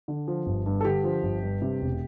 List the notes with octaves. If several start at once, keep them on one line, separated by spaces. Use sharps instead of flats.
D3
F3
G1
G2
A4
D3 G4
F3
G1
G2
C3
E1